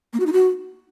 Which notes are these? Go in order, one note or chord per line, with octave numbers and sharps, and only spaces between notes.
A#3
F#4
D#4
F#4